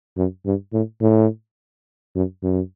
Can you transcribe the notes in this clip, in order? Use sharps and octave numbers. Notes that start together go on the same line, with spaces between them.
F#2
G2
A2
A2
F#2
F#2